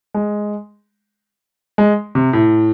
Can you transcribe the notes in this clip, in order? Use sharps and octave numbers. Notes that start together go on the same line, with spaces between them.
G#3
G#3
C3
A2